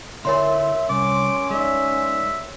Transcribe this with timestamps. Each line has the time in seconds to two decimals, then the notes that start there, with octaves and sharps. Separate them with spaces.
0.25 D3 E4 A#4 C#5 E5 C6
0.90 C2 C#4 D6
1.50 G#3 D4 D#4 E5